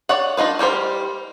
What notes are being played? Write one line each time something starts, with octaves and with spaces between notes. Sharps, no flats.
C#5 D5 F#5
D4 D#4 F4 B4
G3 G4 A#4 C5